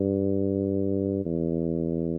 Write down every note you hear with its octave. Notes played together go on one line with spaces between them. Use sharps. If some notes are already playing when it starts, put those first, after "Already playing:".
Already playing: G2
E2